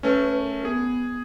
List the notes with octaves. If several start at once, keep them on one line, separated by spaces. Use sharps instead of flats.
A3 C#4 B4
A#4
B3 G#4